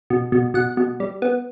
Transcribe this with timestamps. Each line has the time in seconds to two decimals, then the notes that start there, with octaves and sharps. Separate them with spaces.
0.10 B2
0.32 B2
0.54 B2 F#5
0.77 B2
1.00 G3
1.22 B3